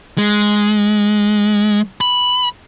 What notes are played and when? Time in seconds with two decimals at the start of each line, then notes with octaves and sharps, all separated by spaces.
0.18 G#3
2.01 B5